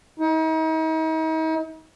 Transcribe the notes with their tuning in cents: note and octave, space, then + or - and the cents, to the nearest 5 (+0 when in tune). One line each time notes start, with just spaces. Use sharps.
D#4 +40